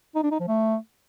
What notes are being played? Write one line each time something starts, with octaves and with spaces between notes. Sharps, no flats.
D#4
D4
D#4
F3
A3